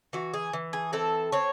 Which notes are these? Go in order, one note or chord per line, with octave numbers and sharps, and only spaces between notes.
E3 F#4
G#4
E3
G#4
C4 A4
C4 C#5